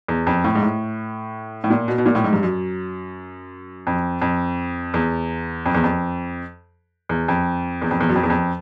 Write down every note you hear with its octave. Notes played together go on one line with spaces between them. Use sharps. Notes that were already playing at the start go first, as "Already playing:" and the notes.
E2
F2
A2
G#2
A2
A2
A#2
B2
B2
A#2
A2
G#2
G2
F#2
F2
F2
E2
F2
E2
F2
E2
F2
E2
F2
E2
F#2
F2
E2
F2